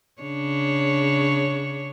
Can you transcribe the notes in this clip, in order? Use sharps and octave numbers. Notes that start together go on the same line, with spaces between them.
C#3 D4 C#5